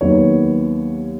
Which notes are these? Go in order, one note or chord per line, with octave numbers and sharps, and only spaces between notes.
D#2 D#3 F#3 B3 C#5